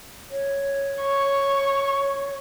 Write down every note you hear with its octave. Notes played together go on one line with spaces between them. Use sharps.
C#5
C#6